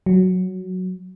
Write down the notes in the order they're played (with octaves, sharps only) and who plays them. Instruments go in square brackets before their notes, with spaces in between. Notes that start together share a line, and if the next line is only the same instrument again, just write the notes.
[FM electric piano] F#3